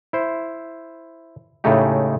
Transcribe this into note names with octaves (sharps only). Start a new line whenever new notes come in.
E4 C5
A2 C#3 G#3 A3 D#4 G4